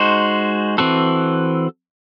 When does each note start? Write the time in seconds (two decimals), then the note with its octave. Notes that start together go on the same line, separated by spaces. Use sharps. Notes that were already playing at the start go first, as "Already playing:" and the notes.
Already playing: G#3 D#4 F#4 C5
0.78 E3 C4 F#4 A4